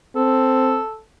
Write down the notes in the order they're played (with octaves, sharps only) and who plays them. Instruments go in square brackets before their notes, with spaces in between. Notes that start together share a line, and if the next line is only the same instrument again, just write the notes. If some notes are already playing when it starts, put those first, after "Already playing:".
[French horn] C4 [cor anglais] A4